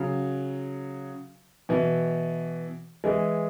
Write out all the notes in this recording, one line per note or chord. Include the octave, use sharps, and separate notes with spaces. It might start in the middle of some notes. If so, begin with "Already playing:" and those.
Already playing: C#3 F#3
B2 E3
E3 G#3